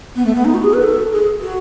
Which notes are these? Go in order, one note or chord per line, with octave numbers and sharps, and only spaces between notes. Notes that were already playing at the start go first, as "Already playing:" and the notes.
B3
A3
B3
D#4
F#4
G#4
B4
A4
G#4
F#4